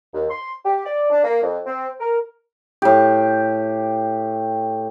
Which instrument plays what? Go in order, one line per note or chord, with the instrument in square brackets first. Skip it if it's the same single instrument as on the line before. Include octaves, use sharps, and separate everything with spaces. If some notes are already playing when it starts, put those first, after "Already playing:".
[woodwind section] D#2
C6
G4
D5
D4
A#3
F2
C4
A#4
[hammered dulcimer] A2 G4